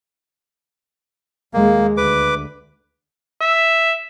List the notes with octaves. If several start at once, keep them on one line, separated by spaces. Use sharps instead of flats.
D#2 G#3 A#3
D2 B4 D6
E5